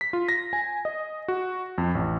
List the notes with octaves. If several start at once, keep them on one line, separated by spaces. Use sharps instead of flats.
B6
F4
A#6
G#5
D#5
F#4
F2
A1